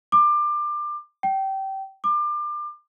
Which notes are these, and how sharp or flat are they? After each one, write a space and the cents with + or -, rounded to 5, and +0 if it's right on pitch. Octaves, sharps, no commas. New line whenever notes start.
D6 +25
G5 -25
D6 +30